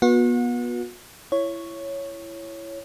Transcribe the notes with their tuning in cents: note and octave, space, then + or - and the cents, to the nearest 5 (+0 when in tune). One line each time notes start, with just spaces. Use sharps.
B3 -30 F#4 -40
E4 +25 C#5 +0